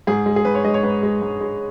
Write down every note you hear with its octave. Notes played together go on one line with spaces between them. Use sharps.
G#2 G#4
G#3
G#4
G#2 B4
C#5
G#3 D#5
C#5
G#2 B4
G#3
G#2
G#3